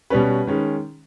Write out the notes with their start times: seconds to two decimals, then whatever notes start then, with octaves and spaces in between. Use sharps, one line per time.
0.10 B2 G3 C#4 B4
0.47 D#3 G#3 C#4